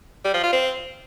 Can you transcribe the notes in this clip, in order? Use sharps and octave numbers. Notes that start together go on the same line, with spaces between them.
G3
F3
F4
C4